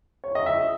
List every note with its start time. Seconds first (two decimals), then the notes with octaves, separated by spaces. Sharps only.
0.24 C#5
0.35 D#5
0.46 E5